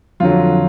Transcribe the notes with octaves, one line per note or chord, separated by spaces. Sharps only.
F2 D3 F#3 F4